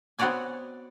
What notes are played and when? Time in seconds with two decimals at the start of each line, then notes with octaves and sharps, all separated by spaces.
0.19 B3 C4 F#4 C#5 D5 G#5